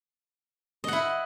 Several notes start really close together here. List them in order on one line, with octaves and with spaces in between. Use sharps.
D#5 F#5 E4